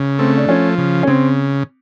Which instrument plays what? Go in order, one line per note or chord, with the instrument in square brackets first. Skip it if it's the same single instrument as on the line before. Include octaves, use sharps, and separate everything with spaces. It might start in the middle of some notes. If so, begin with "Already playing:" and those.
Already playing: [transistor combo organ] C#3
[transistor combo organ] A3 [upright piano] C4
[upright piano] D4
[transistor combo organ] F3 [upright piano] C#4
[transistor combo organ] C#3
[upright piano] C#4
[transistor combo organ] C#3 [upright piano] C4